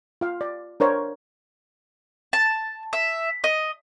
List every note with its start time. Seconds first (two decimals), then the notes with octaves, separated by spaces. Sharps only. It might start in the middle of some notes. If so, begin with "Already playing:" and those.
0.21 F4 F5
0.41 D5
0.80 D4 A#4 C5 C#5 F5
2.33 A5
2.93 E5
3.44 D#5